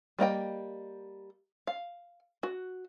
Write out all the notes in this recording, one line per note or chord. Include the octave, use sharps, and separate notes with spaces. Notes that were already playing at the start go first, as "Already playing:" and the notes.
G3 A#3 D#5 G5
F5
F#4